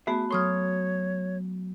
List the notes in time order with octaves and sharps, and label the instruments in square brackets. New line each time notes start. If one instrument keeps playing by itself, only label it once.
[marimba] A3 B3 F#4 [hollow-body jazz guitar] G#4 E5
[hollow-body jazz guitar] F#3 A4 C6 [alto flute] C#5 [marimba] C#6 D#6 F6